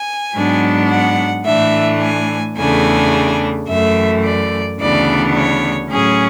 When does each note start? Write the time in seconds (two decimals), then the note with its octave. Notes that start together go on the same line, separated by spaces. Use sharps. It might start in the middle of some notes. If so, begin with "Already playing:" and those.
Already playing: G#5
0.34 G#2 F#3 B3 D4
0.90 F#5
1.45 A2 E3 A3 D4 E5
2.01 G#5
2.57 E2 C#3 E3 A3 D4 G#5
3.68 F#2 E3 A3 E5
4.24 D5
4.80 D2 C#3 E3 B3 D4 D5
5.35 C#5
5.91 A2 F#3 C#4 G#4